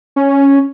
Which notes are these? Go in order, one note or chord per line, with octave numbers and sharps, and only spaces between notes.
C#4